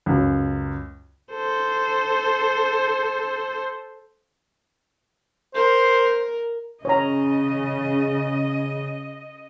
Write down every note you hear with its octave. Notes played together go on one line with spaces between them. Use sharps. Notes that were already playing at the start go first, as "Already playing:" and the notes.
C#2 F#2
A4 C5
A#4 C5
C#3 C#5 D#5 A#5